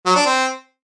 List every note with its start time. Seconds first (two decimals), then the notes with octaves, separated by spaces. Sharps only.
0.06 F#3
0.16 D4
0.26 C4